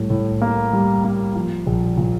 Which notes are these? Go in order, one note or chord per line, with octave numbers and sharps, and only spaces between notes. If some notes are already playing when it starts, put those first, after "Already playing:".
Already playing: A2 G3
A2
A#3
G3
A#3
F3
A#1
A#2